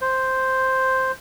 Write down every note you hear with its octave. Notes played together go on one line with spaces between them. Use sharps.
C5